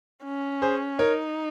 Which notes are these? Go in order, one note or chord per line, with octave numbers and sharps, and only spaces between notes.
C#4
G#4 C5
D#4 A#4 C#5